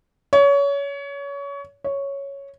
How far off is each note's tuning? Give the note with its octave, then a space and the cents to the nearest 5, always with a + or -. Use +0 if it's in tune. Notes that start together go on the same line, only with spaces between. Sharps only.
C#5 +25
C#5 +0